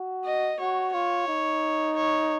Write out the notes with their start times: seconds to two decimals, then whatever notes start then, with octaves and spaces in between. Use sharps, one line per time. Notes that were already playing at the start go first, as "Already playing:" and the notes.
Already playing: F#4
0.25 D#5
0.59 F#4 C#5
0.93 F4 C#5
1.28 D#4
1.96 C#5